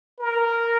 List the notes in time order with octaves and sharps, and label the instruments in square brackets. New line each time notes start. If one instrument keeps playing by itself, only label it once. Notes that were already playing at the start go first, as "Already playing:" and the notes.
[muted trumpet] A#4